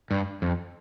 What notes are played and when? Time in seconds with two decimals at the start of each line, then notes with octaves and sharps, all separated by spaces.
0.11 G2
0.42 F2